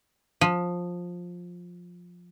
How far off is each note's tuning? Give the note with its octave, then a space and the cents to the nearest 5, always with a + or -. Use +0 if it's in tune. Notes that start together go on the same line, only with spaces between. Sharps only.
F3 +15